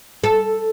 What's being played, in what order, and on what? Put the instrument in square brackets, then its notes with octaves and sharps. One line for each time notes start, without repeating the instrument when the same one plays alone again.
[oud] A4